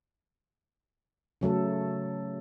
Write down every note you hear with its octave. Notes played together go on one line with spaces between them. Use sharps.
C#3 F#3 A3 A4